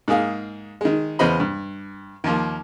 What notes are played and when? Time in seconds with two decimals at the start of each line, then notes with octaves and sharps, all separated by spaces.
0.08 G#2 A#3 G#4 F5
0.81 D#3 G#3
1.19 E2 C#3 B3 C5 D#5 B5
1.40 G2
2.24 D#2 F3 A#3